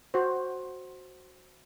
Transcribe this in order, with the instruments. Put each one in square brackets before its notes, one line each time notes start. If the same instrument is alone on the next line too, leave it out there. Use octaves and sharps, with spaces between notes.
[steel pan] F#4 C5